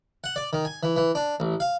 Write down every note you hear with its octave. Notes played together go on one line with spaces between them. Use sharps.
F#5
D5
D#3
G#5
E3
E3
D4
A1
F5